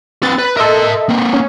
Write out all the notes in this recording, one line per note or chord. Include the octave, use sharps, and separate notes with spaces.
C4 B4 A6
B4
A4 A#4 D#5 E5 C6
A#3 C4
C#4